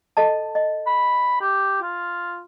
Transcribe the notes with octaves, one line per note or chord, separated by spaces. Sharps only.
A4 D#5 A5
D#5
B5
G4
F4